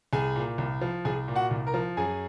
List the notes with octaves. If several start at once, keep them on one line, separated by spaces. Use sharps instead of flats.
C2 G#4 G#5
A#2
C2
F3
C2 G#4 G#5
A#2
F#4 F#5
C2
A#4 A#5
F3
F#2 G#4 G#5